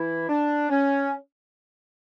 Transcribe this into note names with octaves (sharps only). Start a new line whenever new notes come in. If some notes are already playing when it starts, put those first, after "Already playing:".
Already playing: E3 E4
D4
C#4